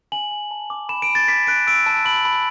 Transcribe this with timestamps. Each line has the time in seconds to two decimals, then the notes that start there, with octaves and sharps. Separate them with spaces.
0.12 G#5 F#7
0.31 G#5
0.51 A5
0.70 D6
0.89 B5 E7
1.02 D7
1.09 B5
1.15 A6
1.28 D6 B6
1.47 F#6 D7
1.67 E6 D7
1.86 A5
2.05 B5 F#7
2.25 B5